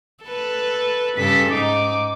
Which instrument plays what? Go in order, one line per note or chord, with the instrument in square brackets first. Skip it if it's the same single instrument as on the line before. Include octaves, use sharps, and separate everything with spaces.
[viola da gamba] A4 B4
[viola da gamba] G2 C#3 A4 [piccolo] B6
[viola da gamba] G#2 D#4 [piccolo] D6